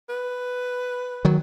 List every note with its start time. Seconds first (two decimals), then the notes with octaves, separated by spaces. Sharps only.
0.09 B4
1.25 D#3 F#3